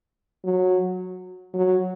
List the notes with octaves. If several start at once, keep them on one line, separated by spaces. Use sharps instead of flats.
F#3
F#3